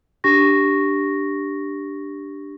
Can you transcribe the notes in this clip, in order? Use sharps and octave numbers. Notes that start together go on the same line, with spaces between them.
D4 G4 C#6 A#6